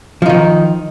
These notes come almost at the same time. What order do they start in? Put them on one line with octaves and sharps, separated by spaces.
F3 D#4 D#3